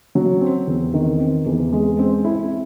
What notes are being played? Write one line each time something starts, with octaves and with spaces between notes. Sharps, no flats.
F#3
C4
E2
D#3
C4
E2
G#3
C4
E4